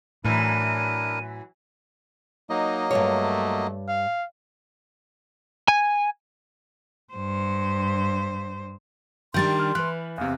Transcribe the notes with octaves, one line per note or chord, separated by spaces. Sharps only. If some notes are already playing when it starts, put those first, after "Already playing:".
F#2 A2 E3 D4 E4 A#4 D#7
F#3 A#3 D#4 D#5
G2 C#3 A3 C#5
F5
G#5
G2 C5
D#3 G3 D4 C6 G6 A6
F6
E3 B4 F#6
E2 C3 F5